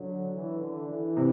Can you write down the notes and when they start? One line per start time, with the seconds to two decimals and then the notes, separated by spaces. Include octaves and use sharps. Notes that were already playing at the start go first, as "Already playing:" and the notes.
Already playing: D3 F#3
0.32 E3
0.60 D3
0.89 E3
1.17 C3